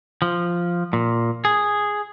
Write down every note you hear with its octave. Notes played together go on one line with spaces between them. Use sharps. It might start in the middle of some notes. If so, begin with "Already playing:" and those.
F3
A#2
G#4